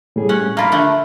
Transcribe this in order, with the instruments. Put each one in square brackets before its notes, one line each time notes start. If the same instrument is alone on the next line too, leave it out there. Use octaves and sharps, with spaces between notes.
[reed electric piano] A2 G3 G#4
[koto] C#4 F#5
[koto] A#3 F4 D5 [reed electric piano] B5 F6
[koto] D3 A3 F#5